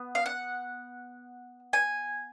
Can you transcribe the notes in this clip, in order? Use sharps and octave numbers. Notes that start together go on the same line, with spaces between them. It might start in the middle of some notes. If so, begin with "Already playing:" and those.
Already playing: B3
F5
F#5
G#5